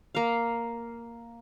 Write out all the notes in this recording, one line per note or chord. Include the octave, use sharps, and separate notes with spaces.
A#3 F5